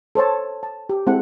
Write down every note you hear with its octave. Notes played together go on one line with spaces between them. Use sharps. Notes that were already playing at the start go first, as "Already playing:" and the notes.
A4 C5 C#5 A5
A5
G4
G#3 C4 E4 A4 F#5